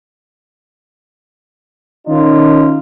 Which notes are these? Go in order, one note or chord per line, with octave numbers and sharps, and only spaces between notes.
D#3 C#4 D#4 F4